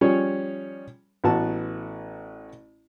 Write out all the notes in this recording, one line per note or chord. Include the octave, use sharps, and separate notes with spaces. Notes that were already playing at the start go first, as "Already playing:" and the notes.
F3 G3 C#4 G#4 C#5
A1 B3 F#4 A5